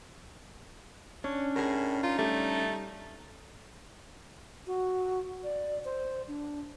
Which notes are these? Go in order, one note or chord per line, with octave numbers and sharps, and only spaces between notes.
C#4 D4 C#5
A2 G#4 A#4
D#4 F4
G3 A3
F#4
D5
C5
D4